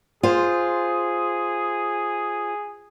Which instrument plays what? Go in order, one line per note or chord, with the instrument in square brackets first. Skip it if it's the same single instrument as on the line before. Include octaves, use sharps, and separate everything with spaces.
[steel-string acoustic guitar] F4 C5 [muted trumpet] G#4